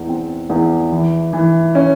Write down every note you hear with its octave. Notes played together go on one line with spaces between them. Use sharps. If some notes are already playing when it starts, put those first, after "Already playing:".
Already playing: E2
C4
E2
E3
E3
C#4